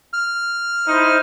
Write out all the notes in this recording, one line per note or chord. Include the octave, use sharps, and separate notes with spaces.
F6
D#4 E4 C5